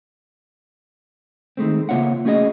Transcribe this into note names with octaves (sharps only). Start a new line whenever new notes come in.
D#3 G#3 A3 C4
C#3 A#3 F4 C#5 E5 F#5
A3 C#4 F#4 G#4 D5 D#5